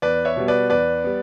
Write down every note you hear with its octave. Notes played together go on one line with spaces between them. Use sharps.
E2 B4 D5
C#5 E5
B2 G3 B3
B4 D5
E2 B4 D5
G3 B3